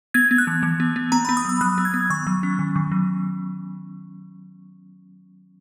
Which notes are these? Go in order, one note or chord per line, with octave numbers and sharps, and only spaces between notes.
B3 G#6
B3
F#6
E3
E3
B3
B3
B3 A#5
B5
B3
D#6
F#3 E6
F#3 F#6
B3
G#6
B3
D#3 C#6
F#3
C#4
D#3
D#3
F#3